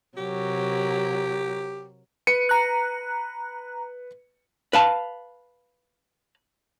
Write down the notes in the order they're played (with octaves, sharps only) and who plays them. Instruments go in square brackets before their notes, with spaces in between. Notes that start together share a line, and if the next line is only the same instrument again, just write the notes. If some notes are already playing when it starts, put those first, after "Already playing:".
[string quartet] C3 F#3 A#4 [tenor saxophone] G4
[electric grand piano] B4 C#7 D#7
[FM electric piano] A#5 F#6
[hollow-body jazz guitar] B4 F5 A5